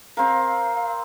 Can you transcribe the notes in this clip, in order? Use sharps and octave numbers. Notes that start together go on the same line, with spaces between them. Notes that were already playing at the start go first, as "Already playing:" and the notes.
C4 A#4 F5